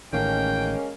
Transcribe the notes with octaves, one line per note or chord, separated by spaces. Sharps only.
A1 A2 D#3 G#3 A#3 C#4 G5